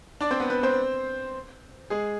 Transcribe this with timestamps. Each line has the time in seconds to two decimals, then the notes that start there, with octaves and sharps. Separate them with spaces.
0.21 D4 D5
0.31 C4 C5
0.40 B3 B4
0.50 B3 B4
0.63 C4 C5
1.90 G#3 G#4